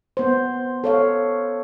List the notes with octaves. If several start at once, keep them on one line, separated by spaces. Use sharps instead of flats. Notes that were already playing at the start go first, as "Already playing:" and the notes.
B3 C5
A4 C#5 F5